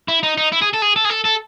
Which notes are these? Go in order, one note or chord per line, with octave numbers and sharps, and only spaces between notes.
E4
D#4
D#4
E4
G#4
A4
G#4
A4
G#4
A4
A4